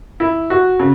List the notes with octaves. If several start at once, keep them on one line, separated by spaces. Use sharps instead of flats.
E4
F#4
C#3